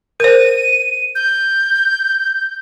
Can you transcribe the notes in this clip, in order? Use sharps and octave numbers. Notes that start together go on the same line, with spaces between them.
A#4 C5 D#7
G6